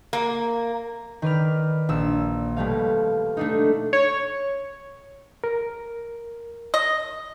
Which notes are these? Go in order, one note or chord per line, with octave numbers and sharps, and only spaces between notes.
A#3
D#3 B4 D5 F6
A#1 E6
B2 G3 A3 F5
A3 D4 D#4
C#5
A#4
D#5